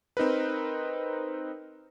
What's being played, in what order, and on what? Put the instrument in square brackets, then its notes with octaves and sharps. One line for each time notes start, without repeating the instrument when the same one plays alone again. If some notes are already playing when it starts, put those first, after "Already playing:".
[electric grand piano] C4 D#4 A#4 B4